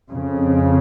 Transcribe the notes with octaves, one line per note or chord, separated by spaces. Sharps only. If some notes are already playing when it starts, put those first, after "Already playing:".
F2 C#3